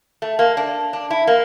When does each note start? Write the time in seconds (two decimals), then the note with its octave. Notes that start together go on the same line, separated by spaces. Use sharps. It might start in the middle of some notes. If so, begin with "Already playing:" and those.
0.22 A3
0.39 A#3
0.57 D4
0.93 D4
1.10 E4
1.27 A#3